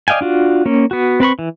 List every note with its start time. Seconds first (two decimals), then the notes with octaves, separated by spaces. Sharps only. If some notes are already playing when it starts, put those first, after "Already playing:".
0.08 D5 D#5 F5 G5 G#5
0.21 D4 F4 F#4
0.66 A#3 C#4
0.91 B3 F#4
1.20 C4 B4 B5 C#6
1.39 E3